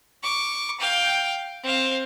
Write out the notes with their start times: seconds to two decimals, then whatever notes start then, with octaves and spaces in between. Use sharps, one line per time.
0.23 C#6 D6
0.80 F5 G5
1.63 C4 F5